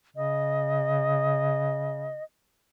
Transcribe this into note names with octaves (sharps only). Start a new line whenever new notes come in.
C#3 D#5